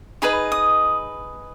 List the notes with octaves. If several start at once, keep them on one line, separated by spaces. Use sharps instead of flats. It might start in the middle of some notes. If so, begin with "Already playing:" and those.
D#4 G#4 B4 D#5 B5
D#6